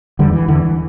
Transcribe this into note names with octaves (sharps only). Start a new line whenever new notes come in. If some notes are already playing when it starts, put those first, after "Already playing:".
E2 D3 G3
E3
E2 D3 E3